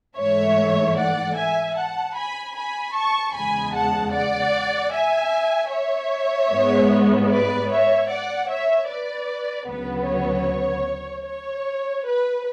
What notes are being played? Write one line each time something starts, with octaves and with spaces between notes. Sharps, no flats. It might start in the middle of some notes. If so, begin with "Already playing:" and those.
G#2 E3 A3 C#5 E5
D5 F#5
E5 G#5
F#5 A5
G#5 B5
G#5 B5
A5 C#6
E2 C#3 G#3 G#5 B5
F#5 A5
D5 F#5
E5 G#5
C#5 E5
G#2 G#3 B3
B4 D5
C#5 E5
D5 F#5
C#5 E5
B4 D5
D2 C#3 F#3 B3 B4
C#5
C#5
B4